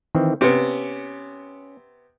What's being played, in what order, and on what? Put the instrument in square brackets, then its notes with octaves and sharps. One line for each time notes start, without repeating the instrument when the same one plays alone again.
[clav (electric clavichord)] D#3 E3 C4
[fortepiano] C3 B3 [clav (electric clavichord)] C#4